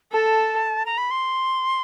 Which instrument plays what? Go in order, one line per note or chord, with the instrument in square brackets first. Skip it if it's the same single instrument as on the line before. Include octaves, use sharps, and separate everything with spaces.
[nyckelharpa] A4 [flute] A5
[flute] A#5
B5
C6